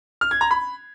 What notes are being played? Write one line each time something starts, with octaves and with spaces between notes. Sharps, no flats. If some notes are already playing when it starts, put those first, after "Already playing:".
F6
G#6
A#5
B5